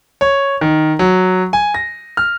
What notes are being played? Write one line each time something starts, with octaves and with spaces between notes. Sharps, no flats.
C#5
D#3
F#3
G#5
A#6
F6